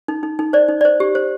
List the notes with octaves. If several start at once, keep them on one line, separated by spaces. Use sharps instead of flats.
D#4
D#4
D#4
C5 D5
D#4
C5 D5
G4
C5